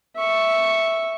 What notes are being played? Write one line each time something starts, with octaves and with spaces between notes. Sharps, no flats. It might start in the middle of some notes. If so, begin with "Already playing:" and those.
E5 C#6